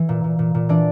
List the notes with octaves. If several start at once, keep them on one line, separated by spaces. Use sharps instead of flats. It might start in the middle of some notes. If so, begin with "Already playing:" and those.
Already playing: E3
A#2
A#2
A#2
A#2
E3 D4 D5